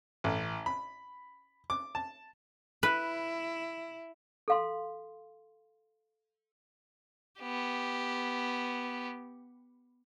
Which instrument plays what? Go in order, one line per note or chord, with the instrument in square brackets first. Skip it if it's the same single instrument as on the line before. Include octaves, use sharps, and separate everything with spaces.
[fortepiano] A1
B5
D6
A5
[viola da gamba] E4 [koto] B4
[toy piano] A4 F5 C6
[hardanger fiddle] B3 G4